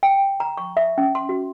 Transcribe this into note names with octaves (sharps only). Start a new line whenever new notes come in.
G5
A#5
C#6
E5
C#4
C6
F#4